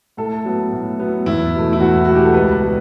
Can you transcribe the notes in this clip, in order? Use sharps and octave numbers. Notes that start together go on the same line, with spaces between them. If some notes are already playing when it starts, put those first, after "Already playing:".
A2 A4
F#3 B3
A2
F#3 B3
E2 E4
B2 A3
E4
E2 F#4
B2 A3 F#4
G4
A4
C#2 B4
B2 G3